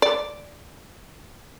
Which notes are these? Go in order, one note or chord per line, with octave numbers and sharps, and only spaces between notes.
D5